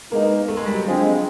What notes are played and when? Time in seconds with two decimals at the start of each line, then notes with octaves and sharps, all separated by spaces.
0.12 G#3 A#3 B3 D#4
0.48 A3
0.57 G#3
0.66 G3
0.75 F#3
0.85 D3 F3 G#3 C4